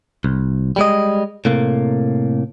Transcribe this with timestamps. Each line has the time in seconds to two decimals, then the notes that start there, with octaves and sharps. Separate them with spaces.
0.24 C2
0.76 G3 G#3 D#5
1.45 A2 C3 A#3